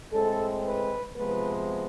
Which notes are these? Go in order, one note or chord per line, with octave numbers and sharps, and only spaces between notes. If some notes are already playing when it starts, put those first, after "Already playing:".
A2 G#3 C4 A4
B4
C3 F3 G#3 B3 B4